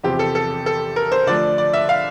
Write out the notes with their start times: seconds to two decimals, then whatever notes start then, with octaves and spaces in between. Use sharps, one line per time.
0.04 E2 C3 F3 C4 G4
0.19 A4
0.35 A4
0.66 A4
0.96 A#4
1.12 C5
1.27 D3 F3 A3 D5
1.58 D5
1.73 E5
1.89 F5